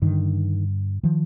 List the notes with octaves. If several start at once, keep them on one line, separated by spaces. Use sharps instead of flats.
G2 D3 D#3
D#3 F3